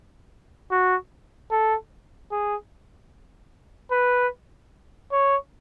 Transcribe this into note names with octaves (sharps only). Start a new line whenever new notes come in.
F#4
A4
G#4
B4
C#5